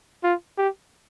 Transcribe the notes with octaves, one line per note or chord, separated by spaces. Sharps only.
F4
G4